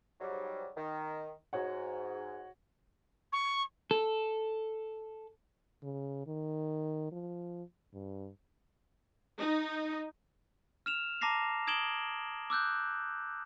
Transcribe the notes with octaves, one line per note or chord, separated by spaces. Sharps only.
G#2 F#3 G3
D#3
G#2 F#4 C#5 F#5
C#6
A4
C#3
D#3
F3
G2
D#4
F6 E7 F7
A5 A#5 D6 A#6 C7 F7
D#6 G#6 D7 E7 F#7 G7
D6 E6 F#6 G6